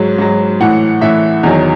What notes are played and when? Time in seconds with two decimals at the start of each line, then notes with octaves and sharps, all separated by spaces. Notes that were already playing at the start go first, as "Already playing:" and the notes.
Already playing: G#2 F#3
0.18 G#2 F#3
0.60 A2 E3 F#5
1.01 A2 E3 E5
1.43 E2 D#3 F#3